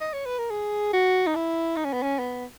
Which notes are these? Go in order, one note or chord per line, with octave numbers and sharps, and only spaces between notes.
D#5
C#5
B4
A#4
G#4
F#4
D#4
E4
D#4
C#4
B3
C#4
B3